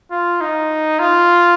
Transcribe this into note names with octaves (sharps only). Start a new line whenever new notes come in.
F4
D#4
F4